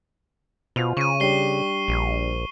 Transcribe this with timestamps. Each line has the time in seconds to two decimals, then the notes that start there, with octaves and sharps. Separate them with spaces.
0.76 B2 F4 C5 F7
0.97 C#3 C#6 D#7
1.20 G3 D4 G4 C7 G7
1.88 A#1